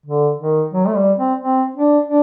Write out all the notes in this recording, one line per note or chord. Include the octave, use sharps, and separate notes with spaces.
D3
D#3
F#3
A3
G3
C4
C4
D4
D4